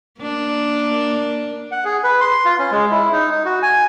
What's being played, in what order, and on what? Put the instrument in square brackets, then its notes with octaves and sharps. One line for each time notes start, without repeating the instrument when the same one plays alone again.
[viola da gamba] A#3 D4
[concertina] F#5
G#4
B4
C6
F4
C#4
G#3
E4
D#4
D#4
F#4
G#5